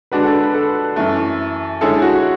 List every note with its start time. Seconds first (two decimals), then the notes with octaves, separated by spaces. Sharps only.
0.12 D3 G#3 D4 F#4 B4
0.23 A4
0.33 B4
0.43 B4
0.54 A4
0.96 F#2 E3 A3
1.81 D3 G#3 C#4 E4 G#4 A4
2.02 F#4